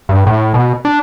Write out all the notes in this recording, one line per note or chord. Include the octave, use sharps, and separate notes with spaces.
G2
A2
B2
D4